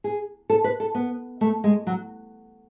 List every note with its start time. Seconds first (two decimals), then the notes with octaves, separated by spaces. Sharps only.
0.04 G#4
0.50 A4
0.64 B4
0.80 A4
0.95 B3
1.41 A3
1.64 G#3
1.87 F#3